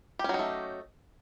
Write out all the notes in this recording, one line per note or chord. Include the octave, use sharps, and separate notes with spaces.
F#3 A3 C#4 D#4 G4